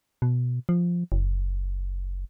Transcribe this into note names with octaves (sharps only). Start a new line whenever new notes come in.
B2
F3
F#1